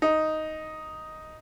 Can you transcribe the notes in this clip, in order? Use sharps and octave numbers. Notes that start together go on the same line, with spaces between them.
D#4